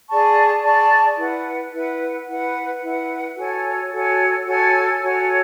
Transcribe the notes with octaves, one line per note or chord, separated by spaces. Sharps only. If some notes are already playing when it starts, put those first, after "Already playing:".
G#4 D5 A5 C#6
G#4 D5 A5 C#6
E4 B4 F#5
E4 B4 F#5
E4 B4 F#5
E4 B4 F#5
F#4 A4 C#5 G#5
F#4 A4 C#5 G#5
F#4 A4 C#5 G#5
F#4 A4 C#5 G#5